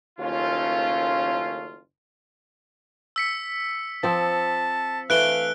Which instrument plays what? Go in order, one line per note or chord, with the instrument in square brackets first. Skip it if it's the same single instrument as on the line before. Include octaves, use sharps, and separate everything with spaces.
[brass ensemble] F#1 D#2 A3 C#4 F4
[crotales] E6 B6 C#7
[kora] F3 C4 [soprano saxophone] A5
[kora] E3 A3 [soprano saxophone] F5 [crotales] F#6 D7 G7